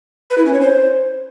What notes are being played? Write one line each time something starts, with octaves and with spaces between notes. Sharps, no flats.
B4
E4
C#4
C#5
C5